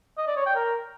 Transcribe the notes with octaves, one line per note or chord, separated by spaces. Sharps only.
D#5
D5
C#5
G5
A#4